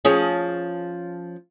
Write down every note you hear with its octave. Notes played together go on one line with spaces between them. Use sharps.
F3 C#4 G#4